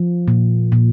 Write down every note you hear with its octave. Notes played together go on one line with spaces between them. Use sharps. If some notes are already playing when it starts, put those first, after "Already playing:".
Already playing: F3
A#2
A#2